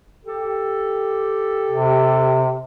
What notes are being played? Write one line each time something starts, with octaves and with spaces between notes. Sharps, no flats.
G4 A4
C3